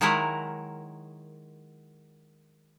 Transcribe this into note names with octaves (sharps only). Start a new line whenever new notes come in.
D#3 F#3 G#3 E4 F#4 A#4